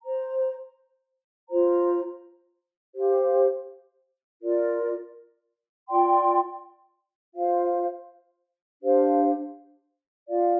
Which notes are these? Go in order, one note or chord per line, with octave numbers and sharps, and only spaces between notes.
C5 A#5
F4 C5 A#5
G4 C5 F5
F4 A#4 D5
F4 D5 G5 C6
F4 C5 F5
D4 G4 C5 F5
F4 D5 F5